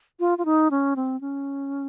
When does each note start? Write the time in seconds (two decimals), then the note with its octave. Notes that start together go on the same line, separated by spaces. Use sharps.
0.20 F4
0.38 F4
0.45 D#4
0.71 C#4
0.96 C4
1.21 C#4